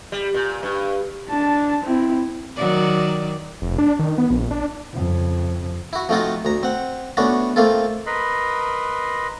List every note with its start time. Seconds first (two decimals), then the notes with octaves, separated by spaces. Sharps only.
0.12 G3
0.34 A#2
0.63 G2
1.29 D4 A5
1.83 C4 E4
2.56 D#3 F#3 D5
3.62 F1
3.78 D4
3.99 D#3
4.18 B3
4.30 A#1
4.51 D4
4.93 F2 C#3
5.93 E4 F#4
6.09 F3 A3 C4 D#4 F4 F#4
6.45 D2 A#5
6.63 C4 F#5
7.17 A3 B3 C#4 D4 F#4
7.56 A3 A#3 C4 F4 A4
8.06 A#4 B4 D#5 B5 C6